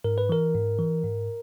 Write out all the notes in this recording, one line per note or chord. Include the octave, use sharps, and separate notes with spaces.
G#2 A#4
B4
E3 A#4
G#2
E3
G#2